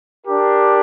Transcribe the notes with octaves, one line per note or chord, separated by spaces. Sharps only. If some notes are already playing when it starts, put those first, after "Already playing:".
D4 G4 A#4